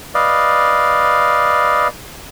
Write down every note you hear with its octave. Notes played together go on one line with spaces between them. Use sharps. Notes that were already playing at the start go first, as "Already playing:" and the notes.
B4 D5 D#5 F5